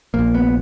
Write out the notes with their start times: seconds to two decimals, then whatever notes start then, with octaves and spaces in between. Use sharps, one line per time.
0.14 A#1 A#2 A#3
0.34 B3